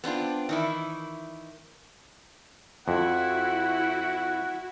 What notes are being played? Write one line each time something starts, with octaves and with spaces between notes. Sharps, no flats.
B3 C4 D4 F4
D#3 E3 E4
F2 E4 F#4 F#5